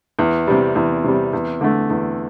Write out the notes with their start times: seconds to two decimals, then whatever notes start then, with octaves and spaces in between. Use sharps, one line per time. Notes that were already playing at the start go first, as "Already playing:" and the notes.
0.19 E2
0.47 C3 G3
0.75 E2
1.04 C3 G3
1.33 E2
1.61 D3 A3
1.90 E2